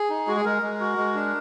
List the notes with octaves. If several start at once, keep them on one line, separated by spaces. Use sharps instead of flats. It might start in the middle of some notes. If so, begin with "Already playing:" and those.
Already playing: G#4
D#4
G#3 F#4
G#4
G#3 A#4
G#3
F#4
G#3
D4